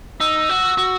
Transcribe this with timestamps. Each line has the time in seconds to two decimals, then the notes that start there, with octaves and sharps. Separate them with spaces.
0.20 D#4 E6
0.49 F#4
0.77 F#4